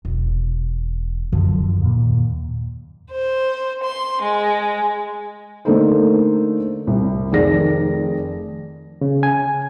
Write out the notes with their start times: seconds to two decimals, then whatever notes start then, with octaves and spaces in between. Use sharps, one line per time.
0.05 E1
1.32 F#2 D3 D#3 F3
1.80 D#2 A#2
3.12 C5
3.84 C6
4.22 G#3
5.65 D3 A3 A#3 D#4 A4 C5
6.87 C2
7.31 F1 D#3 G#4 D5 A#6
9.01 C#3
9.23 G#5